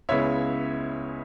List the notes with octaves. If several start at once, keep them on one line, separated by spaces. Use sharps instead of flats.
C#2 C#3 G#3 B3 E4 C#5 E5